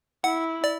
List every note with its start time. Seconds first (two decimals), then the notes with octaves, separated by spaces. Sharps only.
0.24 E4 F#5
0.64 D5